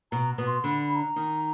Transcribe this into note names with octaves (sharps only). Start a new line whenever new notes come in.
B2 B3 A#5
B2 B3
C6
D3 D4 B5
B5
A#5
D#3 D#4